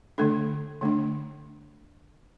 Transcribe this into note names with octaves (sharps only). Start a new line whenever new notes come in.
D3 A3 D4 A4
D3 A3 D4